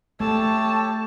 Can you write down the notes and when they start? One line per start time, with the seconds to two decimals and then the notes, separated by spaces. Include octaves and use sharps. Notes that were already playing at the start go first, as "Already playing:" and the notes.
0.20 A3 G4 A4 C#5 A5